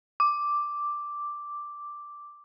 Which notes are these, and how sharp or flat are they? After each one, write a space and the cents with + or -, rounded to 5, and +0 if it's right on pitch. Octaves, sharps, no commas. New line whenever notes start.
D6 +0